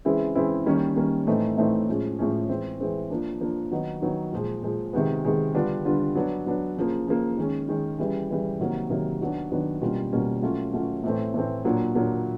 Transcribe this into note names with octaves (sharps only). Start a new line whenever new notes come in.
C#3 E3 G#3 C4 E4
C#3 E3 G#3 C4 E4
D#3 G3 A#3 C#4
D#3 G3 A#3 C#4
A2 E3 A3 C4 D#4
A2 E3 A3 C4 D#4
A2 F3 G#3 C#4
A2 F3 G#3 C#4
E3 G#3 C4
E3 G#3 C4
F3 A#3 D4
F3 A#3 D4
D#3 F#3 B3 D#4
D#3 F#3 B3 D#4
A#2 F3 G#3
A#2 F3 G#3
C3 D#3 G#3 B3
C3 D#3 G#3 B3
D3 G3 B3 D4 F4
D3 G3 B3 D4 F4
F#3 B3 D4
F#3 B3 D4
C#3 F3 A#3
C#3 F3 A#3
D#3 G#3 C#4
D#3 G#3 C#4
C#3 E3 G3
C#3 E3 G3
C3 D#3 F#3 A#3
C3 D#3 F#3 A#3
D#3 F#3 B3 D4
D#3 F#3 B3 D4
B2 G3 A#3 C#4 F4
B2 G3 A#3 C#4 F4
F#3 A3 C#4 F4
F#3 A3 C#4 F4
A2 E3 A3 C4
A2 E3 A3 C4
A#2 F#3 A#3 D4
A#2 F#3 A#3 D4